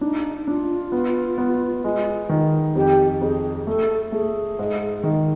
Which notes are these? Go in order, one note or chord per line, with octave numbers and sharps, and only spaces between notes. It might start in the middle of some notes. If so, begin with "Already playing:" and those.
D4 D#4
D4 F4
B3
B3
G#3
D#3
F2 G4
F2 G#4
A3 A4
A3 G#4
G#2
D#3